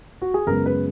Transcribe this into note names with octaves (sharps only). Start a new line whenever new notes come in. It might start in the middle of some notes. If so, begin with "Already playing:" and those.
F#4
G#4
F#2 C#3 G#3 B3 A#4
B4